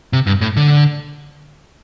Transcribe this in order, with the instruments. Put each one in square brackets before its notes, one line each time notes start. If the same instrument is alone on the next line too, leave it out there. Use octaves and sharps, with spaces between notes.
[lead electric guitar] C3
G2
A2
D3